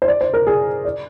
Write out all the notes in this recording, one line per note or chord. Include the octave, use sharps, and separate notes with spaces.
C5
D5
C5
A#4
G#4
D5